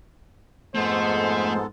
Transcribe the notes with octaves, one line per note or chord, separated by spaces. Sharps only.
F2 G#2 G#3 A3 B3 A4 C5